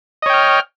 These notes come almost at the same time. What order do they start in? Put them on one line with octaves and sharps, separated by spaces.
D#5 C#5 G5 F6